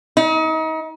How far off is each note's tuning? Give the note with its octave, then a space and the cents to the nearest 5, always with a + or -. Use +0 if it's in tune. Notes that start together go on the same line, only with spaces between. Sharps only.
D#4 +35